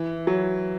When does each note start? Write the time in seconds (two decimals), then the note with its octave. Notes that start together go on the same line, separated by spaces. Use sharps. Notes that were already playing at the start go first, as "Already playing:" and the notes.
Already playing: E3
0.27 F#3